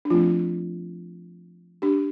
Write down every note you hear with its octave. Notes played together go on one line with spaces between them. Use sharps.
D4
F3 A3 C4 F4
D4 G4